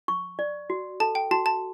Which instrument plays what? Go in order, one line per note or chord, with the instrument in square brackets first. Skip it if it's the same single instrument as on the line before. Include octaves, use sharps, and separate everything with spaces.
[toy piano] C#6
D5
F#4
[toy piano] A4 [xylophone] A5
[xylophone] G5
[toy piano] F#4 [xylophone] A5
[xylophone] A5